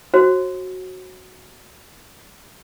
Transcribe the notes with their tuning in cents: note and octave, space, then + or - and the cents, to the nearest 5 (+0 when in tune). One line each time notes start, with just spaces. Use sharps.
F#4 +0 C5 +45